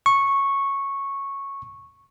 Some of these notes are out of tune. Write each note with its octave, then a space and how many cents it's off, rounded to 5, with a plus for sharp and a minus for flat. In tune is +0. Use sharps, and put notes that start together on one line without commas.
C#6 -10